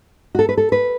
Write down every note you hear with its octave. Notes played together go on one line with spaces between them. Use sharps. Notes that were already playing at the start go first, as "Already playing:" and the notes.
F#4
A4
B4
A4
B4